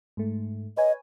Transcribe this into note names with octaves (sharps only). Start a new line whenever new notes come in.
G#2 A3
B4 C#5 D#5 G#5